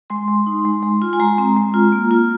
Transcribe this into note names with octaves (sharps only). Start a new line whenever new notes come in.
G#3 C6
G#3
D#4
G#3
G#3
F4
G#5
G#3 A#5
C4
G#3
F4
A#3
F4